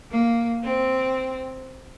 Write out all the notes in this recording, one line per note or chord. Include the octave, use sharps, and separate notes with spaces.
A#3
C4